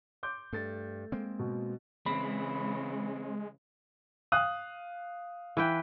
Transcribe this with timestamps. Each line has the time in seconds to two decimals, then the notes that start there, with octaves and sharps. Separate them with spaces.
0.23 C6 D6 G6
0.53 G2 A3 A6
1.12 G#3 A#3 C4
1.39 B2
2.06 C#3 E3 G#3 C4 B5
4.32 F5 D#6 F#6
5.57 E3 B4 G5